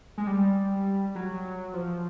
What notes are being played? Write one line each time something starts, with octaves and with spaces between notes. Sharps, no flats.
G#3
G3
F#3
F3